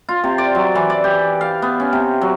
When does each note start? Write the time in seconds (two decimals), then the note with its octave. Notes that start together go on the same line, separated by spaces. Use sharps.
0.09 F4
0.24 C3
0.38 D5
0.55 F#3
0.75 E3
0.90 D5
1.04 G4
1.41 F5
1.62 B3
1.80 C#4
1.93 C3
2.21 F#3